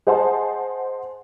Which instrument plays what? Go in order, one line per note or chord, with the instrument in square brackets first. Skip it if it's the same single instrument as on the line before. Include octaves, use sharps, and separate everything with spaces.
[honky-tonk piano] G#4 C5 D#5 F#5 A5 C6